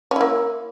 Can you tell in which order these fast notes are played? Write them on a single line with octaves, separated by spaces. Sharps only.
C#4 E4 A#3